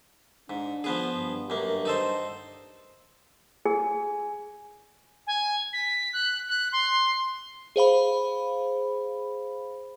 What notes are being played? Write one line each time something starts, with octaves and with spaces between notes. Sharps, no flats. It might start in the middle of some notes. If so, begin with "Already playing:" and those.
G#2 D4
F3 B3 G#4
G2
F#2 A#3
D#4 A4 C5
G#4 G#5
G#5
B6
F#6
F#6
C6
G#4 C5 F5 B5